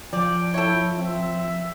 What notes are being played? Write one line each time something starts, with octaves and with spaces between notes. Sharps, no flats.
F3 D5 G5
E4 A4 C#5
C4 E5